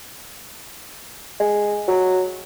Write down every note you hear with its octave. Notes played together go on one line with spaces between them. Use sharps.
G#3
F#3